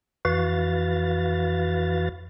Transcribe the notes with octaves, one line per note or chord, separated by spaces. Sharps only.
F2 E3 F#4 B4 F5 A6